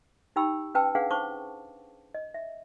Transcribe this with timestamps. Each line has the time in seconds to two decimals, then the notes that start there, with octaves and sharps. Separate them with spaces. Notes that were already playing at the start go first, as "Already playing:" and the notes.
0.36 D#4 G4 G5 B5 E6
0.75 C#4 B4 G5 A5 E6
0.95 C#4 D4 G#4 B4 F5 F#5
1.11 C5 A5 C#6 D6
2.15 D#5
2.34 E5